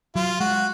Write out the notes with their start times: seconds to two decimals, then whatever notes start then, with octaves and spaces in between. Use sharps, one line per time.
0.16 F#3 F4
0.40 G#3 F#4